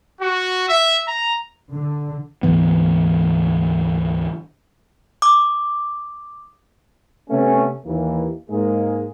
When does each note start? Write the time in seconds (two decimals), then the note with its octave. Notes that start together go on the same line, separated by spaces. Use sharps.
0.20 F#4
0.68 E5
1.07 A#5
1.72 D3
2.43 D2 G#2 E3 B3
5.22 D6 D#6
7.30 C3 A3 B3 C#4
7.86 D#2 E3 A#3
8.50 G#2 G#3 A#3 G#4